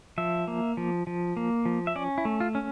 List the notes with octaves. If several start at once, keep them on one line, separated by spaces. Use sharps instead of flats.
F3 E5
A#3
F3
F3
A#3
F3
E5
C#4 D5
E4
A3
F4
C#4